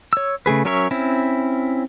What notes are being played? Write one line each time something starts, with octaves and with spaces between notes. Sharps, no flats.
C#5 E6
C#3 A3 G#4 B4
F#3 C#4 A#4 C#5 E5
C4 C#4 E4